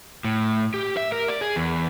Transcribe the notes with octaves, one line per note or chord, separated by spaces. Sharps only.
A2
G4
E5
A#4
D5
G#4
E2